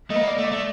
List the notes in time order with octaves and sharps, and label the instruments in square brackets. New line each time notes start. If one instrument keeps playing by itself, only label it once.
[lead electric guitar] A3 [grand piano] D#5
[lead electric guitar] A#3
[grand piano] D5
[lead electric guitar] A3
[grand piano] D5
[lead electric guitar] A3